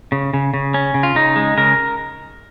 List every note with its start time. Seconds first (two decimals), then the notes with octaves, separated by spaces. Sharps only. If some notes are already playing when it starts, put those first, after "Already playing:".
0.12 C#3
0.34 C#3
0.54 C#3
0.74 C#4
0.94 C#3
1.03 F4
1.15 C#3 D#4
1.36 G#3
1.57 C#3 A#4